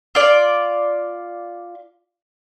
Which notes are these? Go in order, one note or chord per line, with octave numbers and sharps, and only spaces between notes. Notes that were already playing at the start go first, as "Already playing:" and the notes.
F4 D5